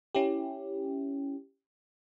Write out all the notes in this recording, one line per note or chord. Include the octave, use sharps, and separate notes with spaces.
C#4 E4 G4